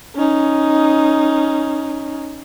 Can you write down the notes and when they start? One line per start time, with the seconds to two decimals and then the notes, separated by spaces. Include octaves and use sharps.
0.15 C#4 D#4